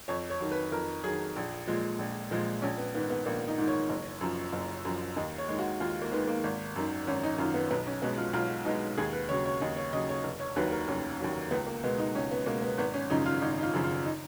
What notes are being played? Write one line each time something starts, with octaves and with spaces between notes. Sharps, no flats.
F2 C#5
C#5
D#3 F#3
B4
F2 A#4
D#3 F#3 G#4
A#1
A#2 F3 G#3
A#1
A#2 F3 G#3
A#1 C#4
B3
G#2 D#3 B3
B3
A#1 A#3
D#4
G#2 D#3
C#5
F#1
F#2 F3
F#1
F#2 F3
D#2 D#5
C#5
D#3 G#3
F#4
D#2 F4
A#3
D#3 G#3 B3
A#3
G#1
F#2 D#3
G#1 C#4
D#4
F#2 D#3 F4
B3
B1 B3
C#4
B2 G#3 B3
F4
B1 F4
B2 G#3 D#4
D#2 G#4
B4
C#3 F#3 C#5
C#5
D#2 D#5
C#5
C#3 F#3 D#5
C#5
F1
C#5
D#2 D#3 F#3 B4
A#4
F1 C#4
D#2 D#3 F#3
C#2 B3
A#3
B2 G#3 B3
D#4
C#2 C#4
B3
B2 G#3 A#3
B3
G#1 B3
C#4
F#2 C#3 F3 D#4
F4
G#1 D#4
D#4
F4
F#2 C#3 F3
F4
D#4